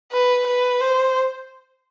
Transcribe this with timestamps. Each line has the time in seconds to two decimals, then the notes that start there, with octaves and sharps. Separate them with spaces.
0.12 B4
0.47 B4
0.81 C5